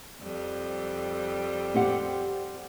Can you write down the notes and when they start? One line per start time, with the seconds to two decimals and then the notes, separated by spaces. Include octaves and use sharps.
0.21 F2 G3
1.74 C4 G4 F#5